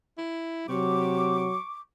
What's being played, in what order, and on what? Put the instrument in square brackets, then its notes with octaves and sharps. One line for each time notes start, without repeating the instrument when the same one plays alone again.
[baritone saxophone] E4
[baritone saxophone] C3 [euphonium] F#3 [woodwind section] C#6 D6